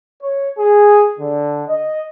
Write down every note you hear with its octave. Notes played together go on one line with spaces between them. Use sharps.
C#5
G#4
D3
D#5